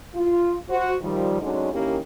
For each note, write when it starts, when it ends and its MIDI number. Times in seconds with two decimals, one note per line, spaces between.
0.15 0.56 65
0.69 0.94 66
0.69 0.94 72
1.01 1.36 51
1.01 1.36 53
1.01 1.36 55
1.41 1.72 38
1.41 1.72 50
1.41 1.72 54
1.41 1.72 56
1.41 1.72 61
1.41 1.72 63
1.72 1.97 51
1.72 1.97 58
1.72 1.97 61
1.72 1.97 64
1.72 1.97 67